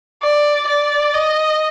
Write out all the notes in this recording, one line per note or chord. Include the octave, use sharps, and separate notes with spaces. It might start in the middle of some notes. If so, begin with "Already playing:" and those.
D5
D5
D#5